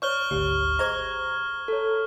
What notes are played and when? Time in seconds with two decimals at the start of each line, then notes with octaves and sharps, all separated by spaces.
0.02 B4 C#5 D5 C#6 F6 G7
0.31 G#1 D2 G4
0.79 G#4 C5 D#5 A#5 G#6
1.68 A4 C#5